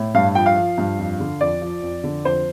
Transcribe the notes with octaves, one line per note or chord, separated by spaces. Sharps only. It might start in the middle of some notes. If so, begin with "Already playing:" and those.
Already playing: A2
G2 F5
F3 G5
F5
F3
G2
F2
D3
F2 D5
F3
F2
D3
F2 C5